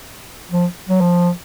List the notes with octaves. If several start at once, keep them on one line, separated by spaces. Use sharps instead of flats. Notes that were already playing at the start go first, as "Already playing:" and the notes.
F3
F#3
F3